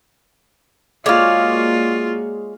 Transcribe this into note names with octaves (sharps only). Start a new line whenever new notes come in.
G#3 A#3 F4 F#4 C#5 D5 F5